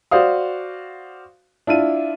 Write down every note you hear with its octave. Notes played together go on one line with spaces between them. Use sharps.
F#4 C5 D5 F5 D#6
D4 E4 F4 D#7